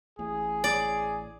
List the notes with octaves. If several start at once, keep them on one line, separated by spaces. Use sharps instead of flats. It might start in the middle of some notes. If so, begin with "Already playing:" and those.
A1 A2 G#4
D5